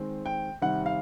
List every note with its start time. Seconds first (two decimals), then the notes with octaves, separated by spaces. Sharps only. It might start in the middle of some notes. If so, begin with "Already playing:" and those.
Already playing: D#3 G#3 C4
0.26 G5
0.62 C3 D#3 G3 F#5
0.86 F5